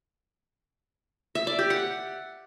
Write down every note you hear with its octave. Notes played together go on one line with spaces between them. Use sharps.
E5
D5
G4
F#5